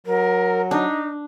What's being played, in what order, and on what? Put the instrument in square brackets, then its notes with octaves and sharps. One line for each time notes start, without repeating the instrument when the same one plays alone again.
[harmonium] F#3 [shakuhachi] A#4
[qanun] D4 [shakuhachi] D#4